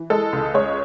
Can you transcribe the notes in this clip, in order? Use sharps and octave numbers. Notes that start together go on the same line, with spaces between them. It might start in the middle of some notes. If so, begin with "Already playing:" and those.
Already playing: E3
G#3 A4
C#2
G#3 C#5